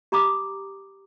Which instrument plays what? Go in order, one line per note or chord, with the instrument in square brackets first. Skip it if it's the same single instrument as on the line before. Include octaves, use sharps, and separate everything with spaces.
[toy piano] G4 A#5 B5 D6 D#6